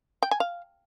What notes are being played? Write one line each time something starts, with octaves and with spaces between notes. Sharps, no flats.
G5
G#5
F5